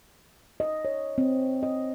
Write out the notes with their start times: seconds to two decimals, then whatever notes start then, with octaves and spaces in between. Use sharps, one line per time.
0.60 D#5
0.85 C#5
1.18 C4
1.63 D#5